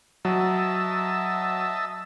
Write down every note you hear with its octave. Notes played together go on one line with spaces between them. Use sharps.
F#3 D#5 E5 A5